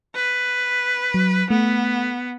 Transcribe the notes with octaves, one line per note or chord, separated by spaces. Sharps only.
B4
F#3
A3 B3